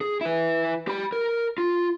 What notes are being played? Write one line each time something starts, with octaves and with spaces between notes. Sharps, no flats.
G#4
E4 B4
G4 B5
A#4
F4